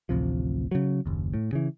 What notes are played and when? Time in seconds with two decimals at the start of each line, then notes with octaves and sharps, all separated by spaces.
0.09 A1 D2 C3 F3
0.71 C#3 F#3
1.06 F#1 D#2
1.34 A2
1.53 C#3 E3